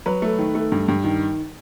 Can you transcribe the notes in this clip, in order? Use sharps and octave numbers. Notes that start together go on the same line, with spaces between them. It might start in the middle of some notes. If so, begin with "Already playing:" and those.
F#3 B4
A3
D#3
A3
G2
G2
D#3